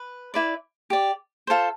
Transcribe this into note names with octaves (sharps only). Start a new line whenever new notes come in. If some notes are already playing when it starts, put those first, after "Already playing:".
Already playing: B4
E4 B4 D5
G4 D5
F4 A4 C5